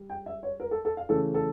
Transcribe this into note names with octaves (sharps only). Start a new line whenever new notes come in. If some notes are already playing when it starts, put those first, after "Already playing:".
Already playing: G3
G5
E5
C#5
A#4
A4
A4
F5
C#3 E3 A3 A4
A4